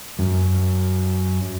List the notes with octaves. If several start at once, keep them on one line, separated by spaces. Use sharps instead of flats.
F#2